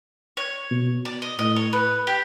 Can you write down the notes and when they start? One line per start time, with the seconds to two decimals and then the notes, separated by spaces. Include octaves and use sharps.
0.37 C#5
0.71 B2
1.05 D5
1.22 D#5
1.39 A2 D#5
1.56 C#5
1.73 B4
2.07 G4